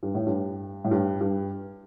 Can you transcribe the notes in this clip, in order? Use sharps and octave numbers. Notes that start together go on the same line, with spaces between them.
G2
A2
G2
A2
G2
G2